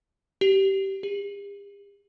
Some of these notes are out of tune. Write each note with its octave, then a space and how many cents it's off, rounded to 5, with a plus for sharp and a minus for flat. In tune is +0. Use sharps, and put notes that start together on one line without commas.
G4 -20
G4 +45